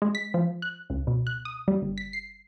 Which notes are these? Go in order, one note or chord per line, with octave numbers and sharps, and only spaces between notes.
G#3
B6
F3
F#6
C#2
B2
F#6
D#6
G3
G1
B6
C7